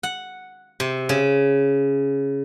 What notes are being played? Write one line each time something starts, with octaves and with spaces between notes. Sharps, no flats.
F#5
C3
C#3